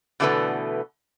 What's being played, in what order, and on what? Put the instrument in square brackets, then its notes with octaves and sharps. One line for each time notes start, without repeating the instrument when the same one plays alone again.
[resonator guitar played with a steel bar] B2 D3 E3 A3 B3 B4